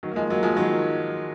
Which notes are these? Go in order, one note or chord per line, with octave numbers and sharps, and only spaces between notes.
D#3 F#3
A#3
F3 G#3
F#3 A#3
F3 G#3
D#3 F#3